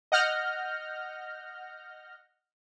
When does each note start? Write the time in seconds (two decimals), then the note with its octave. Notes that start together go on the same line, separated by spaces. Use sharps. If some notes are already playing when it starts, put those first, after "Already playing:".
0.12 D#5 F#5 F6 G6 A#6